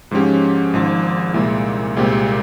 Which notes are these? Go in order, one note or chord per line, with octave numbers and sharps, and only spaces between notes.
G#2 F3 G#3 C#4 G4
G#1 G#2 F3
C2 A#2 G#3 E4
C2 A#2 G#3 C4 G4